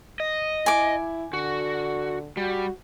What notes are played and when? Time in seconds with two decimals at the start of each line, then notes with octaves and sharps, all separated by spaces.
0.20 D#5
0.66 E4 G#5 D6
1.33 D3 F#4
2.37 G3 F#4